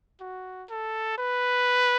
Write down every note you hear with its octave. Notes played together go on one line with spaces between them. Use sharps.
F#4
A4
B4